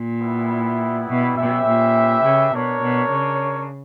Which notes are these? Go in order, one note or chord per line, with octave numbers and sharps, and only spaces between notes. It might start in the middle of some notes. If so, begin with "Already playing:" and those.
Already playing: A#2
G3 B3 E4
B2
B2 C#4 G4 B4 E5
A#2
C#3
B2 D4 A#4 C#5
B2
C#3